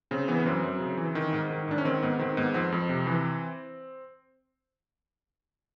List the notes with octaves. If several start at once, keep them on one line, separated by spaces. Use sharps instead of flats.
C#3 C4
E3 B3
B3
F#2 C4
F#2
C#3
E3
D#3
G#2
D#3
G#2 D4
C#4
D#3 C4
G#2 B3
D#3 C4
G#2 B3
F2 C4
F2
C3
E3